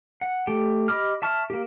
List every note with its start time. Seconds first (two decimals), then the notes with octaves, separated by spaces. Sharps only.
0.21 F#5
0.47 A3 G4 G5
0.88 G4 D#5 B5 D6 F6
1.22 E5 A5 C#6 F6
1.50 A#3 G4